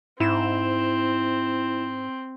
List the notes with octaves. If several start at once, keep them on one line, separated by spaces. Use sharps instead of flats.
G#2 C4 E4 E7